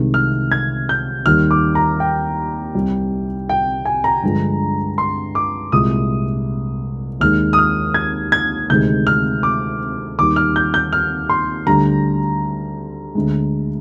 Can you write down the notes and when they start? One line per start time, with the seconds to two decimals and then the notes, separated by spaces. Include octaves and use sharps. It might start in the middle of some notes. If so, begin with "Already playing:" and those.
Already playing: C2 C3 D#3 G#3
0.14 F6
0.52 G#6
0.89 G6
1.26 D#2 D#3 G3 F6
1.51 D6
1.75 A#5
2.00 G5
2.75 C2 C3 G3
3.49 G5
3.85 G#5
4.04 A#5
4.23 G2 D3 F3 G#3
4.98 C6
5.35 D6
5.72 C2 A#2 G#3 D#6
7.20 D#2 D#3 G#3 F6
7.53 D#6
7.58 F6
7.94 G#6
8.32 G#6
8.70 D2 C3 D#3 G#3 G6
9.07 F6
9.43 D6
10.18 D#2 D#3 G3 D6
10.36 F6
10.56 G6
10.74 G6
10.93 F6
11.29 C6
11.66 D2 D3 G3 A#5
13.15 D2 D3 G#3